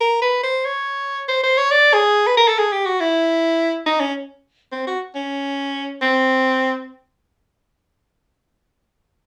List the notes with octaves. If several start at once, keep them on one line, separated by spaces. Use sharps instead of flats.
A#4
B4
C5
C#5
C5
C5
C#5
D5
G#4
B4
A#4
A4
G#4
G4
F#4
E4
D#4
C#4
C4
F#4
C#4
C4